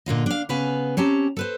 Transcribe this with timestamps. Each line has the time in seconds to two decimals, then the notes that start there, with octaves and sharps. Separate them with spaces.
0.06 A#2 D3 F4 D#5
0.26 D4 F5
0.49 C#3 B3 B4 F5 G#5
0.97 C4 C#4 G4 A5 A#5
1.37 A4 B4 C5